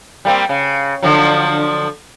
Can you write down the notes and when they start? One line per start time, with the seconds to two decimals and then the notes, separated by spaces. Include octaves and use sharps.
0.25 G3 A#3 C4
0.49 C#3
1.02 D3 F3 F#3